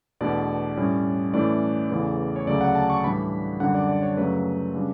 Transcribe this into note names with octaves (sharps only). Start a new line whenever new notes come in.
E2 B2 A3 D4 D5
A2 G3 C#4
A2 E3 A3 C#4 D5
E2 C#3 E3 A3
C#5
D2 C#3 F#3 A3 D5
F#5
A5
C#6
A2 E3 G3 D4 B5
F#2 D3 G3 D4 F#5
D5
D5
C#5
F#2 C#3 F#3 A3 C#4 B4
C#3 G3 D4